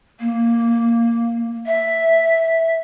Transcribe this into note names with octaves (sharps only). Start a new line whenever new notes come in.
A#3
E5